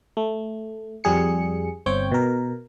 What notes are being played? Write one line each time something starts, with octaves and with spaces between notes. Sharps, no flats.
A3
F2 G3 G#4 C#7
G1 C4 C#5 G5 G6
B2 A#4